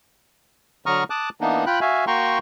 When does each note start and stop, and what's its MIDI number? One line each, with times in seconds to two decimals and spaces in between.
0.86 1.04 50
0.86 1.04 54
0.86 1.04 82
0.86 1.04 85
0.86 1.04 87
0.86 1.04 89
1.10 1.29 81
1.10 1.29 86
1.10 1.29 87
1.10 1.29 90
1.41 1.65 52
1.41 1.65 58
1.41 1.65 59
1.41 1.65 62
1.41 1.65 63
1.66 1.80 65
1.66 1.80 79
1.66 1.80 83
1.66 1.80 90
1.81 2.05 66
1.81 2.05 76
1.81 2.05 77
1.81 2.05 80
2.07 2.39 58
2.07 2.39 66
2.07 2.39 79
2.07 2.39 82
2.07 2.39 84
2.07 2.39 85